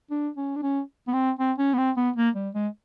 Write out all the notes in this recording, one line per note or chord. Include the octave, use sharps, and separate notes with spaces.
D4
C#4
D4
C#4
B3
C4
C4
C#4
B3
C4
B3
A#3
G3
G#3